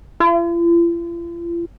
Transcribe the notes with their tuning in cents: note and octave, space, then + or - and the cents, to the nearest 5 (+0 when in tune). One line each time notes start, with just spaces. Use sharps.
F4 -45